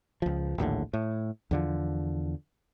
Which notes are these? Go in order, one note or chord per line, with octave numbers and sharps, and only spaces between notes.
C#2 F3
A#1 D#2 A2 D3
A2
E2 D3 F3